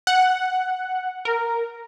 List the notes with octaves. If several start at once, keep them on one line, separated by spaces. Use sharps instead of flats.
F#5
A#4